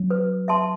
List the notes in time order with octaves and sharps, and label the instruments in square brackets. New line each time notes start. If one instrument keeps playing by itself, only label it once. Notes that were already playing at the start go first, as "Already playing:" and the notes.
Already playing: [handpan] F#3
[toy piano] B4
E5 A5 C6